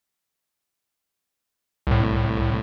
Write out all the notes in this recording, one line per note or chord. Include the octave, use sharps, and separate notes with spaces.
C2 A2